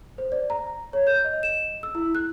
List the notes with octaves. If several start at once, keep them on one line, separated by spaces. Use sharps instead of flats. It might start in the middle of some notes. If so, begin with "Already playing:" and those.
C5
D5
A#5
C#5
G6
D#5
E7
E6
E4
F#6